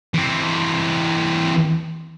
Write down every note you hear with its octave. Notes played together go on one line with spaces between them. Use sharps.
E3 C4